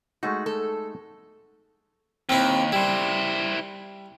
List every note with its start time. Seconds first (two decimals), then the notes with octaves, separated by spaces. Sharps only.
0.23 G#3 A3 D#4 F#4
0.46 A4
2.29 D#2 C4 E4
2.72 G3 E4 C5